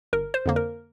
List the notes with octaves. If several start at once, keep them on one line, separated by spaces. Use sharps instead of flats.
G1 A#4
C5
F2 D3 A#3
A#4